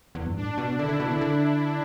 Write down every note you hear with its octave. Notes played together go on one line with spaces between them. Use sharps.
E2
G2
A2 D4
B2
D3 E4
D3
B2
D3
D3